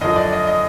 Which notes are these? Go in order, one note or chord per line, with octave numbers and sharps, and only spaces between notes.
F#2 D3 F3 D#5
D5
D#5
D#5